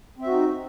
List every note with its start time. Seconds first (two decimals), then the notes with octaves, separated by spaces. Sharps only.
0.18 C4
0.22 E5
0.27 F#4
0.31 D#4